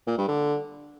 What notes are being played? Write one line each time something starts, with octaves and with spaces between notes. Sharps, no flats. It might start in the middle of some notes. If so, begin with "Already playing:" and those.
A#2
G2
D3